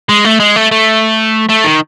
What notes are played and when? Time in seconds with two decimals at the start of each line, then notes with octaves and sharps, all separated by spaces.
0.09 G#3
0.25 A3
0.40 G#3
0.56 A3
0.71 A3
1.49 A3
1.64 D#3